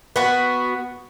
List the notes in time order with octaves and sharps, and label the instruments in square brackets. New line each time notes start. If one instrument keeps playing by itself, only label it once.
[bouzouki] B3 F#4